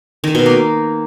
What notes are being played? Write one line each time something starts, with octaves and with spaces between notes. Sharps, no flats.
D#3
B2
A#3